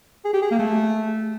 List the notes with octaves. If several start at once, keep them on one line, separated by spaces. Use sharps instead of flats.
G#4
G4
G#4
A#3
A3